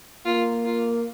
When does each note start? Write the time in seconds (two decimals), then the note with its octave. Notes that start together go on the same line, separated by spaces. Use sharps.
0.25 A#3 F4
0.65 F4